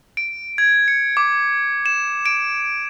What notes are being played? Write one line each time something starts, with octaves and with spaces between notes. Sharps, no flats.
D7
G#6
C#7
D6
E7
D7